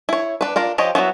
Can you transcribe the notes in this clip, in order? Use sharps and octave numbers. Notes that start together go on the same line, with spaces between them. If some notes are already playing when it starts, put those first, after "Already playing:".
E4 C#5
D4 B4
D4 F4 A#4
F3 F4 G4 C#5 D#5
F#3 B3 E4 F#4